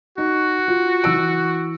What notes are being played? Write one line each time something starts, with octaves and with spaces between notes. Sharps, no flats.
D#4 F#4
F4
E3 E6 D7